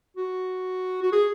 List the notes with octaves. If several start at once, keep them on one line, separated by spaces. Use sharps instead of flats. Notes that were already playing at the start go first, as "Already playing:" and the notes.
F#4
F#4
G#4